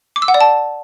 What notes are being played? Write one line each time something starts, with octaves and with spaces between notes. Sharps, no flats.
D6
E6
F#5
D5
A5